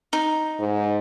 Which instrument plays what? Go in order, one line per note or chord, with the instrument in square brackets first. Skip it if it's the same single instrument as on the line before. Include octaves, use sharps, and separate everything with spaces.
[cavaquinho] D#4
[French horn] G#2